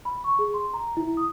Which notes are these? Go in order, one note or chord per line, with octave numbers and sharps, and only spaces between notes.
B5
C#6
G#4
C6
A#5
E4
D#6